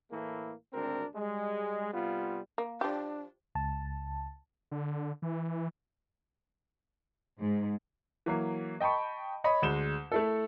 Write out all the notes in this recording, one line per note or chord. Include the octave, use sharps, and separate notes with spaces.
A2 E3 A3 A#3 E4
G#1 D2 C4 D4 A#4
G3 G#3
C3 G3 B3 F4
A#3
F3 D4 G4
C#2 A5
D3
E3
G#2
E3 F#3 A#3
D#5 G5 A5 B5 C#6
C#5 D#5 B5
D2 G#3 E7 G7
A3 E4 A4